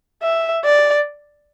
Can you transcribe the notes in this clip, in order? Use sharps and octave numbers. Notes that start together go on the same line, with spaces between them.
E5
D5